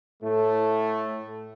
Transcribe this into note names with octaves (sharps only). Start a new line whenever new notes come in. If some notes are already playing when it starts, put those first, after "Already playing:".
A2 A3